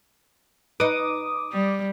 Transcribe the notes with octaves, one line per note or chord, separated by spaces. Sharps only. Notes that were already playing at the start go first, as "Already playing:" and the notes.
D#4 B4 D6 D#6
G3